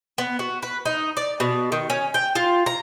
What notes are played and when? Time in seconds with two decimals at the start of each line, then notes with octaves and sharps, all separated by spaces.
0.18 B3
0.39 F#4
0.63 B4
0.85 D#4
1.17 D5
1.40 B2
1.72 D#3
1.90 C#4
2.14 G5
2.35 F4
2.66 A#5